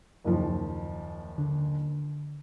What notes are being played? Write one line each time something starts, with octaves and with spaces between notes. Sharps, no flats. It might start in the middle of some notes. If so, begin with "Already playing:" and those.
F#1 D#2 F3
D3